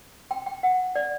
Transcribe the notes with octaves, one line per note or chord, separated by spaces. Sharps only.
G5
G5
F#5
D5